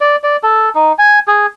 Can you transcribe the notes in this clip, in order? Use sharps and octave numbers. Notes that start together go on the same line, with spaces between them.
D5
D5
A4
D#4
G#5
G#4